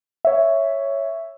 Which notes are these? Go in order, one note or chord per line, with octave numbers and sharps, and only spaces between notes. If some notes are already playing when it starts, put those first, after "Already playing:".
C#5 E5